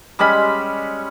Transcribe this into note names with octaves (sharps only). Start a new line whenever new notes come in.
G3 G#3 C#4 B5